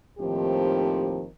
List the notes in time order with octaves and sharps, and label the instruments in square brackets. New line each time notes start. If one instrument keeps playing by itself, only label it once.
[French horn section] D#2 A2 D#3 F3 C4 G4